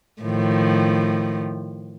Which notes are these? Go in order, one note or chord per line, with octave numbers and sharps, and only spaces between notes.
A2 D#3 F3